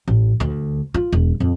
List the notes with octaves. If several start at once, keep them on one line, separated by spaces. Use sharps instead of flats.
A1
D2
F4
E1
F2